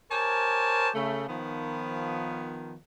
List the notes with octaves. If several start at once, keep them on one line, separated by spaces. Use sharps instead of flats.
G4 A#4 C5 C#5 G#5 A5
C#3 A3
D#3 F3 B3